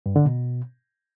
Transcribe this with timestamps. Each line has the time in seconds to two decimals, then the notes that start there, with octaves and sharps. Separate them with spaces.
0.06 G2
0.16 D3
0.26 B2